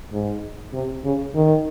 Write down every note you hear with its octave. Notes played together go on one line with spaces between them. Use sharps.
G#2
C3
C#3
D#3